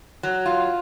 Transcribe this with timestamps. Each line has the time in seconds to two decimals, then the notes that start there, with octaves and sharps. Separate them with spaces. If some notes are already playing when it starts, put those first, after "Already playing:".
0.23 F#3
0.46 F4